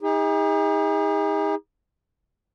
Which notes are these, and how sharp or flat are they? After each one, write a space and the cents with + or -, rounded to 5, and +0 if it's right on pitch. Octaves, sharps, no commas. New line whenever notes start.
D#4 +35 G#4 -40